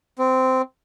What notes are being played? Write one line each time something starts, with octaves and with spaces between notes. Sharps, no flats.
C4